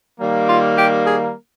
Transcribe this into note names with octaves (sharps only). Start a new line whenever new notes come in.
D#3 G3 A#3
F4
G4
G#4